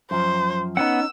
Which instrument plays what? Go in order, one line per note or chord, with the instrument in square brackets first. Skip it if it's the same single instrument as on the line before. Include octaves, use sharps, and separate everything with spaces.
[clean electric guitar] F#2 F3 [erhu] C5
[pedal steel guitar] B3 F#5 [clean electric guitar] C#4 D#4 [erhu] E6